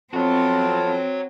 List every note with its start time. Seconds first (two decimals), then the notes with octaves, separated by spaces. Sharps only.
0.14 F2 B3 C4 F4 F#4 C#5 A5